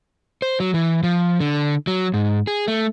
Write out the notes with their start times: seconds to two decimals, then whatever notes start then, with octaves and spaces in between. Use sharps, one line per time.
0.42 C5
0.60 F#3
0.74 E3
1.03 F3
1.40 D3
1.87 F#3
2.14 G#2
2.47 G#4
2.68 A3